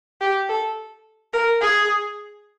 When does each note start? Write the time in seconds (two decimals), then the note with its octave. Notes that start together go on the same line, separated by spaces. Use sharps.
0.21 G4
0.49 A4
1.33 A#4
1.61 G#4